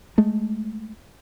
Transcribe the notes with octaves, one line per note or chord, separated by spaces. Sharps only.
G#3 A3